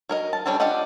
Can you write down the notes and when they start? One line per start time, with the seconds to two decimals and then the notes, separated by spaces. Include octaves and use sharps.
0.09 F#3 A#4 D#5
0.33 A5
0.46 G3 C#4 D4 A4 A5
0.60 D4 F4 G4 D#5 F#5